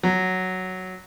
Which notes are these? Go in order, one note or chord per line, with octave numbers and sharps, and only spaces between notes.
F#3